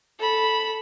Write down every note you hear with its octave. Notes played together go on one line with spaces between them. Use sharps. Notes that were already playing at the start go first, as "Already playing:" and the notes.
A4 B5